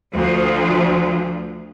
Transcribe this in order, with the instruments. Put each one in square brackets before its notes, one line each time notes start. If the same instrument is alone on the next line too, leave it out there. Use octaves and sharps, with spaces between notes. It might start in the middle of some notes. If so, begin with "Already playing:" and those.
[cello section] D2 F3